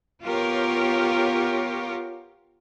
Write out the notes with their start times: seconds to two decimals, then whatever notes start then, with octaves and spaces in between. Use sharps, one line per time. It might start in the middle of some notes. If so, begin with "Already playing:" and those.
0.23 B3 F4 G4 A#4 C#5